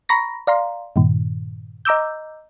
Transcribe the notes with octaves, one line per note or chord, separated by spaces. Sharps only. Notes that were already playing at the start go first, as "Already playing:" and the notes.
A#5 B5 C#6 A#6
D5 F5 A#5 C6
G2 A#2 D#3
D#5 A#5 D6 E6 G6